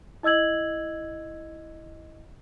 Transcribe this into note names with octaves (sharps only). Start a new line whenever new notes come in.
E4 D#5 E6 G#6 F#7